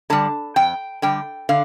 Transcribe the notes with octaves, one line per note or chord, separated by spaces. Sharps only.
D3 G3 A5
F2 G5
D3 G3 G5
D3 F5